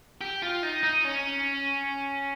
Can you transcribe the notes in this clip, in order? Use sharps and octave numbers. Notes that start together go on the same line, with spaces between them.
G4
F4
D#4
D#4
C#4